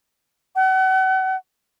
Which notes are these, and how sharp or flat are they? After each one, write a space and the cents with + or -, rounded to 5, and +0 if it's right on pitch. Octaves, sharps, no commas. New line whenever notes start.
F#5 +35